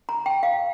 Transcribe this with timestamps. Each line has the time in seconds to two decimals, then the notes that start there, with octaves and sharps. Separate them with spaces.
0.09 A#5
0.26 G5
0.43 F5